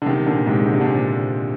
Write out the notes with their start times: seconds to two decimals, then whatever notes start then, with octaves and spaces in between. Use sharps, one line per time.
0.02 D3
0.06 C3 D#3
0.26 A#2 D3
0.46 G#2 C3
0.66 D3
0.74 C3
0.81 A#2 D3